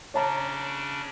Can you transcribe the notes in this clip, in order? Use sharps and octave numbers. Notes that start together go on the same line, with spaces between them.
C#3 D4 C#5 A5 A#5